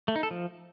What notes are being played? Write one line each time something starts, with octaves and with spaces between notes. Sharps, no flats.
A3
D#4
A4
F3